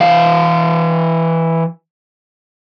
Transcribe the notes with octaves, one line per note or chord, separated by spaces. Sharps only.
E3 F5